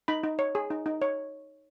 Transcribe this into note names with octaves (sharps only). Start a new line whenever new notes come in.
D#4 B5
D#4
C#5
G#4
D#4
D#4
C#5